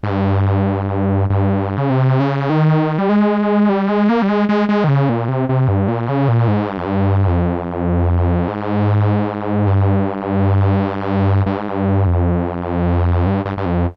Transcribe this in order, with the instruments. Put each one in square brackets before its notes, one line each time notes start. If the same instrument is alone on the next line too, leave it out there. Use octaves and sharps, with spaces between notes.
[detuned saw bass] G#2
G2
G2
C#3
C3
C#3
D#3
G3
G#3
G3
G#3
A#3
G3
G#3
G#3
G#3
D#3
C#3
A#2
C3
C3
G2
A#2
C#3
A#2
G#2
G2
F2
G2
F2
G#2
G2
G2
G#2
G2
F2
G2
G2
G2
F2